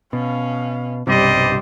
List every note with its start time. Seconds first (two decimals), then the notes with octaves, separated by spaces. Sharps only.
0.13 B2 C#4 F5
1.07 B1 G2 C3 G3 C5 D5 D#5